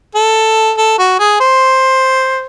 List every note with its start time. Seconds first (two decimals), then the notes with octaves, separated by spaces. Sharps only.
0.15 A4
0.77 A4
0.99 F#4
1.19 G#4
1.40 C5